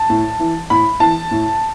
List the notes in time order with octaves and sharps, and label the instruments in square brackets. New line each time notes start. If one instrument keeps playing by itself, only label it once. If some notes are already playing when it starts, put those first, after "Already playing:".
Already playing: [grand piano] A5
A2
E3
A2 B5
E3 A5
A2